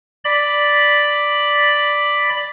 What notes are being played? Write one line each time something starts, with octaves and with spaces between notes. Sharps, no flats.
D5 B5